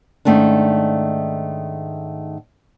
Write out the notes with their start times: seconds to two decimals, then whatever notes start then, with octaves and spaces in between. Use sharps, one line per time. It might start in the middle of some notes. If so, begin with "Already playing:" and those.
0.25 G#2 D#3 A3 C#4 D4